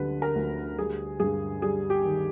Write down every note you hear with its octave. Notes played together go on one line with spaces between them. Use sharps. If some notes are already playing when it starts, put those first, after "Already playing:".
Already playing: D2 D3 G3 B4
A#4
D2
G3 G#4
G2 G#4
G3 G#4
G4
D#3